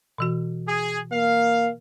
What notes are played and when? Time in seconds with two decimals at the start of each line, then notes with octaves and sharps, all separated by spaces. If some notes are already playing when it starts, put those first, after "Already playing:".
0.18 B2 E3 F#4
0.68 G#4
1.12 A#3 F5